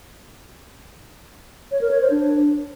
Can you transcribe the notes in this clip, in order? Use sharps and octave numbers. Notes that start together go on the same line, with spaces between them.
C#5
A#4
C#5
C5
D4